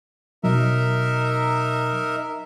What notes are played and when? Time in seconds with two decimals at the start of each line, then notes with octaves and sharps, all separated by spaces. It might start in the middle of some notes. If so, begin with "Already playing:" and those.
0.44 B2 F#3 D#4 A#4 E5